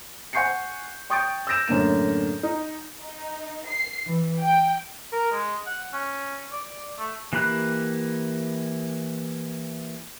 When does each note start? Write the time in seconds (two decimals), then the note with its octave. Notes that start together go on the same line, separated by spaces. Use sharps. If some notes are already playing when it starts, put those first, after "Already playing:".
0.33 F#5 G#5 C#6 G6 C7 C#7
1.10 G5 C#6 D#6 G6 A6 D7
1.47 E6 G6 A6 A#6 D7 E7
1.68 F#2 A2 D3 A#3 E7
2.43 D#4
3.01 D#4
3.68 C7
4.04 E3
4.42 G5
5.12 A#4
5.32 G#3
5.66 F#5
5.93 C#4
6.52 D5
6.99 A3
7.33 E3 A#3 G4 B5 F#6